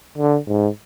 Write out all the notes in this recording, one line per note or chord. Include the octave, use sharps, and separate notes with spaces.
D3
G#2